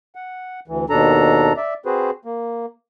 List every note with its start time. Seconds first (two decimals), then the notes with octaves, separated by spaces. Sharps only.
0.15 F#5
0.68 D2 E3
0.90 D#2 B2 D4 A4 A#5
1.57 D5 E5
1.86 C4 F#4 G#4 B4 C5
2.25 A#3